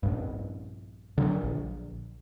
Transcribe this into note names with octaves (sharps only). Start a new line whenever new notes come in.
A#1 G2
D3 D#3 F#3
A#1